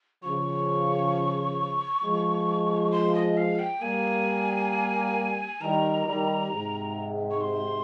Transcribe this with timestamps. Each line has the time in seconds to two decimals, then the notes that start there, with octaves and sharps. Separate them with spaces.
0.23 C#3 F3 C#6
2.03 F3 G#3
2.92 C6
3.15 D#5
3.37 F5
3.59 G5
3.82 G3 A#3 G#5
5.61 D#3 G3 A#5
6.06 D#3 G3
6.51 G#2 C3
7.31 C#6
7.41 C6